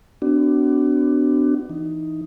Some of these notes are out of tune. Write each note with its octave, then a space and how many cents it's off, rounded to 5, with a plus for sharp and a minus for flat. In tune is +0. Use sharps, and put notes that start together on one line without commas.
B3 +40 D4 +0 F#4 +30
E3 +0 D#4 +0